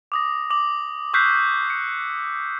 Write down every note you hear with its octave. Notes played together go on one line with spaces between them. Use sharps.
D6 D#6 A#6
D6 F#7
C#6 E6 F#6 G6 B6 C7
C#7